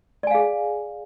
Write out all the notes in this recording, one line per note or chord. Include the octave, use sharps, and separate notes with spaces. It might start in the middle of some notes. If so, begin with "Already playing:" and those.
G#4 D5 F5 G#5